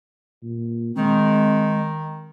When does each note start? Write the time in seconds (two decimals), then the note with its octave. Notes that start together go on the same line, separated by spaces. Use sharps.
0.43 A#2
0.96 D#3 G#3 C4